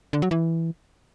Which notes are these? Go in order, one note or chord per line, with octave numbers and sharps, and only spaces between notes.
D3
F#3
E3